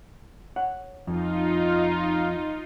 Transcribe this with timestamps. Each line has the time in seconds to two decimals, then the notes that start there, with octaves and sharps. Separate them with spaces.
0.56 C#5 F#5
1.07 F2 D#4 F4